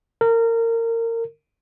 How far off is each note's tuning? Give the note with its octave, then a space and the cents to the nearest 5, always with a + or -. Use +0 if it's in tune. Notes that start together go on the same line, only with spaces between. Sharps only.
A#4 -25